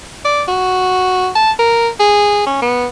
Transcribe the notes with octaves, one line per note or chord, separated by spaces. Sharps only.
D5
F#4
A5
A#4
G#4
C#4
B3